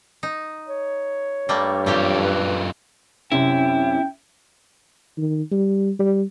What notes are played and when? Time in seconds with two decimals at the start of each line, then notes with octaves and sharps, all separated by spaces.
0.23 D#4
0.68 C#5
1.49 G2 G3 A3 A#3
1.86 F#2 A3 A#3 F4 G4
2.23 B4
3.32 F#2 C3 C#4 E4 G5
5.18 D#3
5.52 G3
5.99 G3